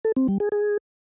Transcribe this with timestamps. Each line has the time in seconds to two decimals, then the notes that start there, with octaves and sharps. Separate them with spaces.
0.05 A4
0.16 C4
0.28 G3
0.40 G#4
0.52 G#4